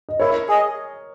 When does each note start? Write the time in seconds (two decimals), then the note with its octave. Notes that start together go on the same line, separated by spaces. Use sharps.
0.09 D#5
0.20 E4 A#4 C#5
0.48 G#4 D#5